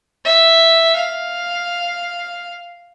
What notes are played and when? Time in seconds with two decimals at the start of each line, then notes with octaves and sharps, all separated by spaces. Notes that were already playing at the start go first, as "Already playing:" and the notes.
0.25 E5
0.96 F5